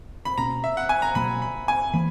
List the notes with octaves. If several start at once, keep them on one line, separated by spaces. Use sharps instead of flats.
B5
B2 A#3 C#4 A#5
E5
F#5
G#5
A#5
B2 F#3 A#3 B5
B5
G#5
E3 A#3 B5